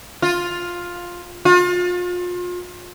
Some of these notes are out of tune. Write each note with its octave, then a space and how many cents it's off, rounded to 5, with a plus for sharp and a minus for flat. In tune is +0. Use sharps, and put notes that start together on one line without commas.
F4 +10
F4 +35